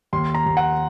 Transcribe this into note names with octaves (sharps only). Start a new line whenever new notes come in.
D#2 C6
A#5
D#2
F#5